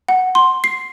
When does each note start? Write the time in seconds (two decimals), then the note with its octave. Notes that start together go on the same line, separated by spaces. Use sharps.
0.08 F#5
0.35 C6
0.64 C7